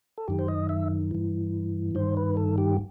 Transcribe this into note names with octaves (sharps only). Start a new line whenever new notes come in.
A4
F#2 D#3 G4
C5
D#5
E5
G2 E3
G2 D#3 C5
B4
A4
G4